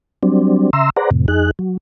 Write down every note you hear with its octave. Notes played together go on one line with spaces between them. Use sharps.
F#3 G3 C4 D4
C#3 E5 A#5 C6 E6
G#4 B4 C5 D5 F#5 A#5
F2 A2 C3
F2 D#4 G#4 F#6
F#3